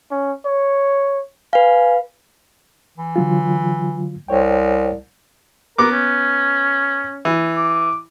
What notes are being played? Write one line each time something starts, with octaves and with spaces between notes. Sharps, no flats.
C#4
C#5
B4 F5 G#5
E3
D3 F#3 F4
C2 C5 C#5 G5
B3 A#4 D6
C#4
E3
D6